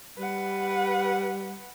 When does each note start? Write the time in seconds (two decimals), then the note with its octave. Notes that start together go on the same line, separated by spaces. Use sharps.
0.18 G3 B4 F#5